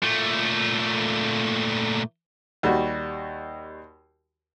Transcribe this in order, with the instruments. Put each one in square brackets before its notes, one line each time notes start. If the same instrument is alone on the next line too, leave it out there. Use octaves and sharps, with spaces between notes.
[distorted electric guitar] A#2 A3
[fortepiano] D#2 G3 F#4